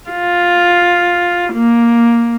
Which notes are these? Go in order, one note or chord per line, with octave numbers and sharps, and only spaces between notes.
F4
A#3